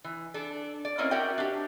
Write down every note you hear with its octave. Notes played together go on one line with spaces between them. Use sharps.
E3
D4 A4
D5
A#3 C4 C#4 E4 A#4 D#5
F#4 A#4 C#5 D5 E5 G5
D4 G4